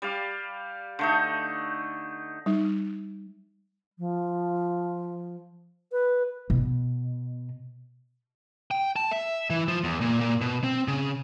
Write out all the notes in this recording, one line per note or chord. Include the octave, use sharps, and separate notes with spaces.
G3 D5 F5
D3 A3 D#4
G3 D#4
F3
B4
B2
G5
A5
E5
E3
F3
E2
A#2
A#2
B2
C4
C#3